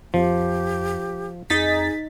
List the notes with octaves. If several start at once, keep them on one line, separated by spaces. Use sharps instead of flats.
F2 F3 G4
F2 D#4 G#4 A6 B6